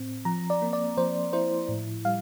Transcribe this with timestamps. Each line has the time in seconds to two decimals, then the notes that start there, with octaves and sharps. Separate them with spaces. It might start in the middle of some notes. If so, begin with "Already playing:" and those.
Already playing: A2 C4
0.25 F3 A#5
0.50 D5
0.62 A#3
0.73 D5
0.97 F3 C5
1.33 E4 C5
1.69 A2
2.05 G3 F5